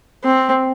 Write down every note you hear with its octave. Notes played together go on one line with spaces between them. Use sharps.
C4